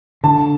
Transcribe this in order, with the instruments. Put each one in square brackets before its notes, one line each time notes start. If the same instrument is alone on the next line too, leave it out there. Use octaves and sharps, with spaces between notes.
[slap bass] D3 [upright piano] A5